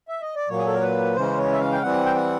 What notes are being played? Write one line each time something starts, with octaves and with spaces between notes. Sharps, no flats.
E5
D#5
D5
A#2 F#3 A#3 C#5
G#4
A4
A#4
B4
C#3 E3 G#3 C#4 C5
C#5
E5
F5
G5
E3 G3 C4 F#5
G5
F#5